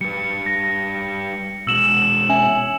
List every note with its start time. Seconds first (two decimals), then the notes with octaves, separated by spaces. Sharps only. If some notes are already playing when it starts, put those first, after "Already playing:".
0.01 G3 B4 C#7
0.46 A#6
1.67 B2 G#3 E6 E7 F#7
2.29 C#4 E5 G#5